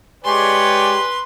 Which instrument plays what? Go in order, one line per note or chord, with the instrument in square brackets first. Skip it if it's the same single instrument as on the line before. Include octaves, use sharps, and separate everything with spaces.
[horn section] G#3 G4 [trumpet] B4 [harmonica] C#5 D5 G#5 [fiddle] C6